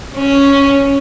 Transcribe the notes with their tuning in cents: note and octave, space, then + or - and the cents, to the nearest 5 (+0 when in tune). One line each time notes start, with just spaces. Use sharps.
C#4 +0